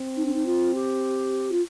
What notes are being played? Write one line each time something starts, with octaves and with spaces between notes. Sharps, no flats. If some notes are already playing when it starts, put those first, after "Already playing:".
Already playing: C4
D#4
D4
D#4
F4
G4
F4